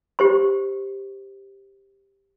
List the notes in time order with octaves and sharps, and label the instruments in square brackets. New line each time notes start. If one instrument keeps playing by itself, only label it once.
[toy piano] G4 C5 C6